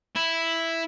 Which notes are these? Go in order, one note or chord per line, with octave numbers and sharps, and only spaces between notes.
E4